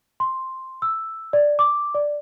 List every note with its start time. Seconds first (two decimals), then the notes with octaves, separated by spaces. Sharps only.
0.20 C6
0.82 E6
1.33 D5
1.59 D6
1.95 D5